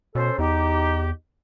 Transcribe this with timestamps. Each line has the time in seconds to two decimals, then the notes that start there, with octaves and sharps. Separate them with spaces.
0.15 B2 C#4 A4 C5
0.39 E2 D#4 G4